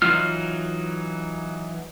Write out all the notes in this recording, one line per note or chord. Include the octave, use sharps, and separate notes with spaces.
E3 F#3 D#4 F4 F6